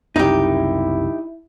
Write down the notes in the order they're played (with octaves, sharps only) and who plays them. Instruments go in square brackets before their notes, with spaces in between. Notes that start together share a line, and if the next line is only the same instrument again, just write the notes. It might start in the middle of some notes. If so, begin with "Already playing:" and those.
[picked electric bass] F#1 C2 [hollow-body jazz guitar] D#4 G4 [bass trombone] E4